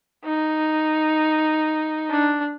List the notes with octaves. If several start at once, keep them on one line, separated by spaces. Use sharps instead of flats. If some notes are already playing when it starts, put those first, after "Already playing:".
D#4
D4